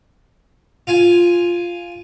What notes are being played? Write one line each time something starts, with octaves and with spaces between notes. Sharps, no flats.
F4 F5 G#5